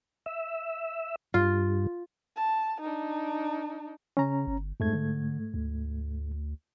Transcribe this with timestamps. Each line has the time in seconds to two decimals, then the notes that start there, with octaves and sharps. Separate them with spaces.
0.26 E5
1.34 G2 F4
2.36 A5
2.81 D4 D#4
4.17 C#3 C#4 A#5
4.47 G1
4.80 F2 G#2 A3 G#6
4.93 D3
5.54 D2